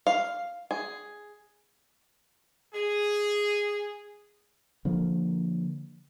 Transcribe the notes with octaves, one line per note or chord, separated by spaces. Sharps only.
F5
G#4
G#4
D3 F3 A#3